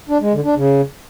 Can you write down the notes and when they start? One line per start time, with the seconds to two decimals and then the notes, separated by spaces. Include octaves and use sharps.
0.09 D4
0.21 G#3
0.33 D3
0.45 D4
0.56 C#3